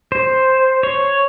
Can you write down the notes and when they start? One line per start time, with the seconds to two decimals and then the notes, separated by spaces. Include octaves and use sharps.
0.12 C5
0.83 C#5